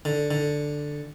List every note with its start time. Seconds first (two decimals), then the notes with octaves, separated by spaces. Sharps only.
0.05 D3
0.31 D3